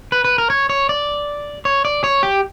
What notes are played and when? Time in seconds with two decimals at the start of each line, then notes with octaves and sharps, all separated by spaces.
0.12 B4
0.24 B4
0.38 A#4
0.50 C#5
0.69 C#5
0.89 D5
1.65 C#5
1.85 D5
2.04 C#5
2.23 G4